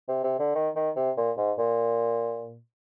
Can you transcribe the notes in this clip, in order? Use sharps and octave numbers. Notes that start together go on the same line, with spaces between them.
C3
C3
D3
D#3
D#3
C3
A#2
G#2
A#2